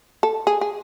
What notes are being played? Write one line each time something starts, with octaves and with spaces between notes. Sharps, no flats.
A4
G#4
G#4